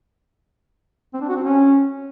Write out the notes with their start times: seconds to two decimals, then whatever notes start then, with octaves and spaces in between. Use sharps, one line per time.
1.14 C4
1.21 D4
1.29 F#4
1.36 C4
1.44 C#4